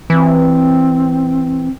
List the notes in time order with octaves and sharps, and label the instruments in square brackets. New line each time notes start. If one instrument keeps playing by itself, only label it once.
[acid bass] E3 [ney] C4